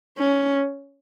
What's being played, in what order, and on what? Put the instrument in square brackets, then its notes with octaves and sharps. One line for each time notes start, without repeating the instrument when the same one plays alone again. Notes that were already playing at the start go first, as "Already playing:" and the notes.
[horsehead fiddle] C#4